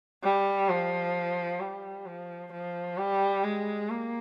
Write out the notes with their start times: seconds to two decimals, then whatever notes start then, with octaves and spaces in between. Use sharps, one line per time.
0.23 G3
0.69 F3
1.60 G3
2.06 F3
2.53 F3
2.98 G3
3.44 G#3
3.90 A#3